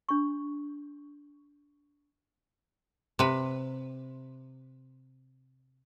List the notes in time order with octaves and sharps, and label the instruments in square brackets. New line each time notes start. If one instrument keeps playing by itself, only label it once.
[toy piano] D4 C#6
[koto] C3 B4